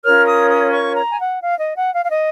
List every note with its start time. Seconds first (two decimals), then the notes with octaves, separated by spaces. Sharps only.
0.04 C#4 F4 A#4 C#5 F6
0.27 D#6
0.50 D#6
0.73 C#6
0.96 A#5
1.09 G#5
1.19 F#5
1.42 F5
1.59 D#5
1.76 F#5
1.93 F5
2.04 F5
2.10 D#5